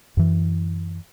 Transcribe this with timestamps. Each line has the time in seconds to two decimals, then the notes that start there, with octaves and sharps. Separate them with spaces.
0.17 F#2 E3